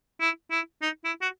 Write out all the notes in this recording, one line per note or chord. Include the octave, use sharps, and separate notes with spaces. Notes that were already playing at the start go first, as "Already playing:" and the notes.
E4
E4
D#4
E4
F#4